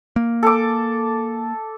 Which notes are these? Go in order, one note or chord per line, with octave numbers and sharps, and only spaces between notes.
A#3
A4 D6